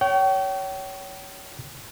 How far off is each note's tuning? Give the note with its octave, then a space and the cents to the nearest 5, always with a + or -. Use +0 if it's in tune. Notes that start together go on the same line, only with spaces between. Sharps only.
C#5 +15 G5 -35